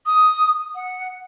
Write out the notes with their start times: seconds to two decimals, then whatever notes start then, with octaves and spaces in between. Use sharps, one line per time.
0.06 D#6
0.75 F#5